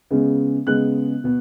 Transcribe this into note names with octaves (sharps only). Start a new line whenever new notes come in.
C#3 G#3 B3
C#3 G#3 B3 F#6
B2 B3